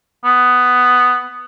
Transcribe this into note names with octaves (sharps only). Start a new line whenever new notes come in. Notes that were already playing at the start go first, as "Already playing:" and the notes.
B3